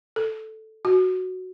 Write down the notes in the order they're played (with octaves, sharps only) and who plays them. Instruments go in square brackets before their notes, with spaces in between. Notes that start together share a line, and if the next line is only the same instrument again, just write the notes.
[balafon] A4
F#4